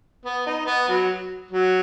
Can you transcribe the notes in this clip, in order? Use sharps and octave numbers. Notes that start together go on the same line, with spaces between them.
B3
D#4
B3
F#3
F#3